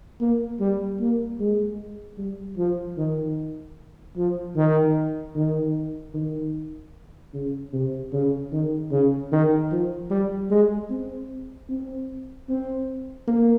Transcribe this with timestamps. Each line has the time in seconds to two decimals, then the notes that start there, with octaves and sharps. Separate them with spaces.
0.21 A#3
0.60 G3
1.00 A#3
1.40 G#3
2.18 G3
2.57 F3
2.97 D#3
4.16 F3
4.56 D#3
5.35 D#3
6.14 D#3
7.34 C#3
7.73 C3
8.12 C#3
8.52 D#3
8.91 C#3
9.32 D#3
9.71 F3
10.10 G3
10.50 G#3
10.90 C4
11.69 C4
12.49 C4
13.28 A#3